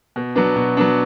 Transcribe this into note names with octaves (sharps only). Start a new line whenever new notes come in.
B2
F#3 B3 D4
B2
F#3 B3 D4